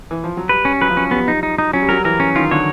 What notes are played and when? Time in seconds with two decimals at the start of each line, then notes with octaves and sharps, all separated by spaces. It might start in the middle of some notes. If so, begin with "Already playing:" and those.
0.11 E3
0.24 F3
0.37 F#3
0.49 G3 B4
0.65 C#4
0.81 F#3 B4
0.90 F3
0.97 F#3 C#4
1.11 G3 B3
1.28 D#4
1.43 D#4
1.58 D#4
1.73 F#3 C#4
1.82 G3
1.89 F#3 A#4
2.04 E3 A#4
2.20 C#4
2.36 D#3 F4
2.51 D3 C#5